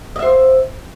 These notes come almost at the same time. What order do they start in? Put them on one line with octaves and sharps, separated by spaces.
D#5 E5 C5